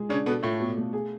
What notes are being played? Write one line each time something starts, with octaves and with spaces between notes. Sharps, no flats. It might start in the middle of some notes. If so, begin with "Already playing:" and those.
Already playing: G#3 G#4
C#3 C#4 D4
B2 B3 A4
A2 A3 F4
B2
A3
G#4